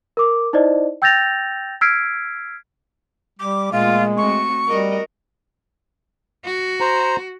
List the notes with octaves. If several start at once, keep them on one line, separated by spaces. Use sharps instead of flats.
A#4 D6
D#4 E4 C5 D5 D#5
G5 E6 G6 A6 A#6 F7
E6 F6 G#6 B6 C7 D7
G3 D6
A#2 G#3 A3 F4
A3 C4 F#4 C#6
G3 F#4 A#4 D#5
F#4
C5 A#5